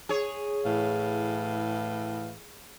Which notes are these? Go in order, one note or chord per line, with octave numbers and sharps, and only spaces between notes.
G#4 C#5
A2 E3 F5